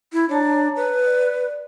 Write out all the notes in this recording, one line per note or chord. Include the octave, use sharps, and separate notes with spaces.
E4
D4 C#5 A5 A#5
B4
D5